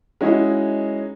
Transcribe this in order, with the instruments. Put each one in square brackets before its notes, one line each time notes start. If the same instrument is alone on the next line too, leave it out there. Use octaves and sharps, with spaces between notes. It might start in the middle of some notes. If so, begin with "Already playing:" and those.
[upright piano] G#3 C#4 D#4 E4 F#4 G#4